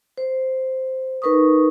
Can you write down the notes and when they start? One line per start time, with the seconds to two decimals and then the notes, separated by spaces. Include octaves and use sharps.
0.18 C5
1.22 D#4 A#4 B4 C#6 D#6